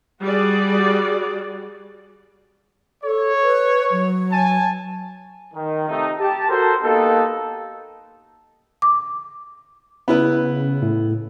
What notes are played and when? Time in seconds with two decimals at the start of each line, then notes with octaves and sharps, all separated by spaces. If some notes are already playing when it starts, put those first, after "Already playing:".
0.22 G3 F#4 G#4 D5
3.04 A4 C#5
3.43 B4
3.92 F#3
4.31 G#5 A5
5.54 D#3
5.88 C3 F3 A3 D#4
6.19 G4 A5
6.48 F#4 A4 A#4 C5
6.82 A#3 B3 D#4 G4 A4
8.82 D6
10.08 C#3 B3 E4 B4
10.82 A2